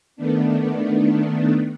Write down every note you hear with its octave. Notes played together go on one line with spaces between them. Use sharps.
D#3 A3 B3 D4